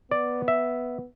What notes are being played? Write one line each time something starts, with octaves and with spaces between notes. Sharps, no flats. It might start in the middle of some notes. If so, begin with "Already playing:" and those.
B3 D5
E5